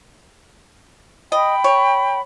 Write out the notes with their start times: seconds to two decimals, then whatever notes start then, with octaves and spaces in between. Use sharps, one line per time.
1.32 D#5 G5 B5
1.64 C#5